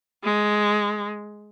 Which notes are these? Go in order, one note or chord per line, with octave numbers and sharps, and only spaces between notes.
G#3